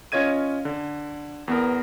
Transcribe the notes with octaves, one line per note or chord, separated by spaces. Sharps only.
C#4 F4 C#5 D#5 G#6 D#7
D3
E2 B3 A#4